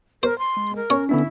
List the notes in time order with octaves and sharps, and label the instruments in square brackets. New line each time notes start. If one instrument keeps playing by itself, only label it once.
[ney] A#4 [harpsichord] C5
[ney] C6
[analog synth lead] G#3
[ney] A#4
[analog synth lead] C#4 [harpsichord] C#5
[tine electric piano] D3 B3 D4 [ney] E4